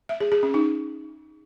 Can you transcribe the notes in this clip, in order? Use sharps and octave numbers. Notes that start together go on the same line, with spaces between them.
E5
G#4
G#4
C#4
D#4